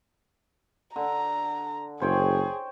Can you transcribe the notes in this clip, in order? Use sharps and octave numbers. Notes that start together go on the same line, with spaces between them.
D3 A#5
F#1 G#4 C5 C#5 G5